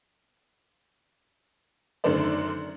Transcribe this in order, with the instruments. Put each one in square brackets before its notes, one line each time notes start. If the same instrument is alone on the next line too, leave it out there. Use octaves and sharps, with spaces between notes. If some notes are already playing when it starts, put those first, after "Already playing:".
[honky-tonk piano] F#2 D3 D#3 A3 C5 D5